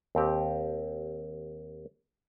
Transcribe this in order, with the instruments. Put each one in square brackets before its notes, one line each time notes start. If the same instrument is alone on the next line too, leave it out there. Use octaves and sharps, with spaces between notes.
[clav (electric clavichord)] D#2 C4 G4